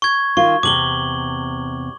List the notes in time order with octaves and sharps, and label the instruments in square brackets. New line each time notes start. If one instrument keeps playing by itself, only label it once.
[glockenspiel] C#6 G#6
[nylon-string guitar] D#3 F4 [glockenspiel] C#6
[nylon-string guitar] E2 G2 C3 [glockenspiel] D6 F#7 G7